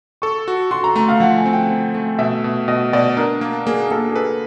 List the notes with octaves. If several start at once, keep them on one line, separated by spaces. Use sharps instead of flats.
A4 C#6
F#4
F#4 C6
A#5
A3 A#5
F5
F3 F#5
G#5
C4
G5
C4
A3
B2 E5
B2
B2 D#5
B2 D5
D4 A#4
A#3
A#3 G#4
A#3 A4
G#4
A4 B4